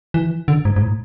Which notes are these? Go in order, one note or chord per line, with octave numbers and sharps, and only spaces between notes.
E3
D3
G#2
G#2
A2